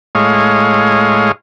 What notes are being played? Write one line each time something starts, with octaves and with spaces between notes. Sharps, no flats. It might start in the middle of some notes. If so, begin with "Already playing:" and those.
A2 G#3 C#5 D#5 F5